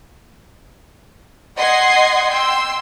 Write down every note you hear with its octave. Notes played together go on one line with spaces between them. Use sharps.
D#5 F#5 C6 D#6 G#6 C7
G5 C6 E6